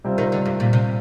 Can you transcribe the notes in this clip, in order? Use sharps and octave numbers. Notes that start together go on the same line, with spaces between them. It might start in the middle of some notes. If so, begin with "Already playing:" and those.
C3 G3 C4 F4
D#3
D3
G2
A#2
C3